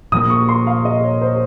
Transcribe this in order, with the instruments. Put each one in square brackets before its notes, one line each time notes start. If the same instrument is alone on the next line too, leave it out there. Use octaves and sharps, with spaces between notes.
[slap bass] A#2 F3 A#3 [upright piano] D#6
[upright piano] C#6
C6
F5
D#5
C#5
C5